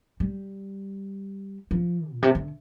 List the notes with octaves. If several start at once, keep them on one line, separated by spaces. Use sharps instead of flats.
G3
F3
A#2
C3
D3